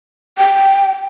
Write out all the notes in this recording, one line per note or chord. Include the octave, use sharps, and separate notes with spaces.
G5